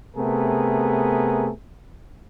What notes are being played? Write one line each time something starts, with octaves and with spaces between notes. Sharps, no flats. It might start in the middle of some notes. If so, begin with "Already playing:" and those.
C3 A3 B3 G#4 A#4